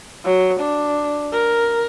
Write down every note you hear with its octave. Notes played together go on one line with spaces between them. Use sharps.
F#3
D4
A#4